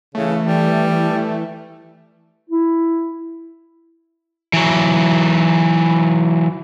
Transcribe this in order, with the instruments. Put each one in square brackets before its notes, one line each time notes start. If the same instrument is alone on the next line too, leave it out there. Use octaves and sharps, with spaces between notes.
[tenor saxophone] C#3 [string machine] E3 [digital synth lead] A3
[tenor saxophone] G3
[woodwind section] E4
[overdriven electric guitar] E3 F#3